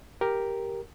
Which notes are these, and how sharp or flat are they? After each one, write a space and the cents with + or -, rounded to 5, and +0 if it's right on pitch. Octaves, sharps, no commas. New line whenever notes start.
G4 +0 A#4 +0